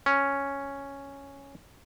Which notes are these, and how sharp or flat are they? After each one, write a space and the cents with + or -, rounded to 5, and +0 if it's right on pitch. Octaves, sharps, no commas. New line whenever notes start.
C#4 +0